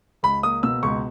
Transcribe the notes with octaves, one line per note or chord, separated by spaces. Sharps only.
C#2 B5
A#3 D#6
B2 E6
C#2 C#6